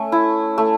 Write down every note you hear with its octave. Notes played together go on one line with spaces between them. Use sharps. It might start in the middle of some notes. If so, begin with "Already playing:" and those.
Already playing: A3 C#4
E4
A3